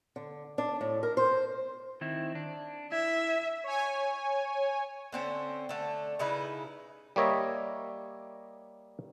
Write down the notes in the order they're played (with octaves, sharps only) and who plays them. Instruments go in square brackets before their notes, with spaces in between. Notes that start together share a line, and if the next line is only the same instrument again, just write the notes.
[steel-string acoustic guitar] D3
D4
A2
A#4
C5
[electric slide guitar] D#3 C4 E4
D4
[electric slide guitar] E4 [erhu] E5
[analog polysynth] C#5 G#5
[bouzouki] D3 C4 C#4
D3 A3
C#3 D#4 E4 B4
[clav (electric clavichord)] G3 A#3 C#5 D#5 E5